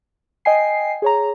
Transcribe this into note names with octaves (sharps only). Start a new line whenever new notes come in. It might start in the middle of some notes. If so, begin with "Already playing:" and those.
D#5 G5 G#5 C7
G#4 C#5 A#5